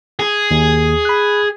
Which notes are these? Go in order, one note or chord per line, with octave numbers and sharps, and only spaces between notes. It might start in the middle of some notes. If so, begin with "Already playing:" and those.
G#4
D#2
B5 F#6